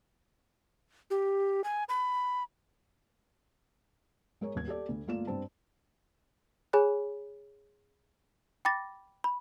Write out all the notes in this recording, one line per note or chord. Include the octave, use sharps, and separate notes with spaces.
G4
G#5
B5
G#3 A#4 C#5
D#1 G#6
G4 A4 D5
D2
G1 A3 A#3 F4 D5 E7
G2 C4 A5
G#4 C#5 G#5 B5 F#6
G5 B5 D6 A6 A#6
B5